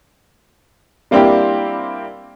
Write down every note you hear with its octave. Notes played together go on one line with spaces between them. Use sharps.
G3 A#3 C4 D4 E4 G4